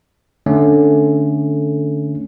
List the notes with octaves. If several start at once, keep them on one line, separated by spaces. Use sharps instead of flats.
D3 A3 C#4